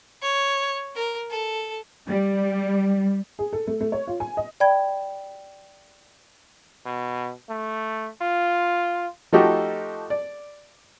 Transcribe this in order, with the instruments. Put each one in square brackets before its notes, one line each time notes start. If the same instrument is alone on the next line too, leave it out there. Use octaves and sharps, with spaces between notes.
[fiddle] C#5
A#4
A4
[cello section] G3
[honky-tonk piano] G#4
A4
A3
A3
C#5
F4
G#5
D#5
[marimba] D5 G5 B5 G#6
[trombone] B2
A3
F4
[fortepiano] F3 A3 D#4 F#4 G4 A4
D5